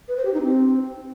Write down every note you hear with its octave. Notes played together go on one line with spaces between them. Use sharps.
B4
C5
G4
D#4
C4